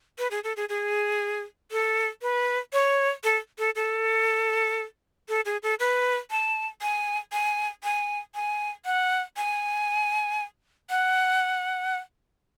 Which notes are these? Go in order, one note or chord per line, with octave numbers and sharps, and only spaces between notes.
B4
G#4
A4
G#4
G#4
A4
B4
C#5
A4
A4
A4
A4
G#4
A4
B4
A5
G#5
G#5
G#5
G#5
F#5
G#5
F#5